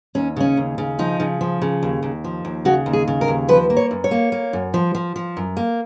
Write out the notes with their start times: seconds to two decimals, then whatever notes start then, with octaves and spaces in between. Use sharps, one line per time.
0.15 D#2 C#4
0.36 C#3 C#4
0.57 D#2
0.78 C#3
0.99 F3 D#4
1.20 C#3
1.41 F3
1.62 C#3
1.83 D#2
2.03 D#2
2.24 F3
2.45 D#2
2.65 C#3 F#4
2.86 D#2
2.93 G#4
3.07 C#3
3.21 A#4
3.28 D#2
3.48 F3 B4
3.70 A#3
3.77 C#5
3.91 F#2
4.04 C#5
4.11 A#3
4.32 A#3
4.53 F#2
4.74 F3
4.95 F3
5.16 F3
5.37 F#2
5.57 A#3